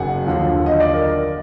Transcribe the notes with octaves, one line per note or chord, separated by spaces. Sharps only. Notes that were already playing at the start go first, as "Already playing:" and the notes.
Already playing: F#1 F#2 D#3 F#3 F#5 G#5
D#2 D3 F3
D#5
D5
A#4